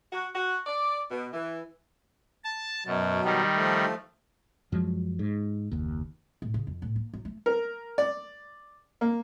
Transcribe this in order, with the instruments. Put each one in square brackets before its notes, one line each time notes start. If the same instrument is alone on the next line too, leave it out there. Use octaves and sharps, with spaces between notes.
[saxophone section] F#4
F#4
D5
B2
E3
[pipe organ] A5
[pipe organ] F#2 [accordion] B2 F#3
[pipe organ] D#3 G3
[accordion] F3 A3
[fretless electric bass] F#2 F3 F#3 G#3
G#2
F#1 D#2
[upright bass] A2
C#3
F2
A2
A#3
F#3
A3
[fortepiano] A#4
D5
A#3